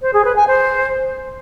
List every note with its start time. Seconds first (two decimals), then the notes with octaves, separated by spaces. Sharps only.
0.02 C5
0.13 G#4
0.25 B4
0.36 G#5
0.48 C5